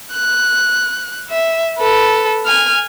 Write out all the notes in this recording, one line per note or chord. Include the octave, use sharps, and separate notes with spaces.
F#6
E5
A4 B4
G#5 F6